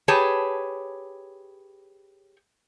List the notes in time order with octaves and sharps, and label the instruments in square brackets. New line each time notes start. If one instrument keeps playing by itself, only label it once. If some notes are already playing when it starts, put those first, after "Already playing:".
[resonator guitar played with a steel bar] G4 G#4 B4 C#5 A5